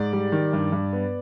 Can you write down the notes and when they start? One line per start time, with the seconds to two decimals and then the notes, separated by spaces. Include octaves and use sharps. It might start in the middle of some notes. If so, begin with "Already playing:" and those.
Already playing: G#2 D5
0.13 G3
0.32 D#3
0.53 G2
0.72 G2
0.93 B3